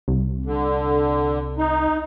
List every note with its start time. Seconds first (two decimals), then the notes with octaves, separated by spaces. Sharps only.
0.08 C2
0.46 D3
1.58 D#4